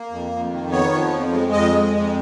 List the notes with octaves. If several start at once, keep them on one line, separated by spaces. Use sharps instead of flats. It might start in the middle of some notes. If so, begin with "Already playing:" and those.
Already playing: A#3
F2
F2
D#3
B3 C#5
F3
F2
G#3
F2 D#5
G#3
F2